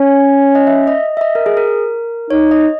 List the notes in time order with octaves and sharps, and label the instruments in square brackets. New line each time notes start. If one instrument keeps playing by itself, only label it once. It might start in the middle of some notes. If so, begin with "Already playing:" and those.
Already playing: [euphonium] C#4 [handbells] C#5
[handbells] D#5
E5
D#5
E5
D#5
A#4
G#4
A#4
[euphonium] D#4 [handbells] C#5
[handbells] D#5